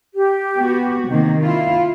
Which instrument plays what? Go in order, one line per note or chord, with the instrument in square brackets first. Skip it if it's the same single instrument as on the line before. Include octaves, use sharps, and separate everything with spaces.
[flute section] G4
[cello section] B3 F#4
C3 D#3 A#3
[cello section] E4 F4 [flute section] F5